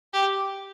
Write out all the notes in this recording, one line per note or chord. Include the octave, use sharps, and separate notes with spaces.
G4